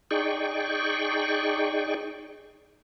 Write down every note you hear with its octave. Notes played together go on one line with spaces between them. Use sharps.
D#4 G#4 D5 G5 C#6